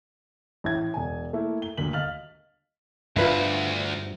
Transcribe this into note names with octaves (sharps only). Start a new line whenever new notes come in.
A1 A2 E5 G#6
E1 G#5
A3 A#3 E4
G7
D#1 D2 A#3 B6 F#7
D#5 F5 F6 A6 F#7
D2 G2 F3 F4 B4 E5